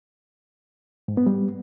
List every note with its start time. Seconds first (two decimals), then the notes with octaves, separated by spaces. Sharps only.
1.08 G#2
1.17 B3
1.26 G3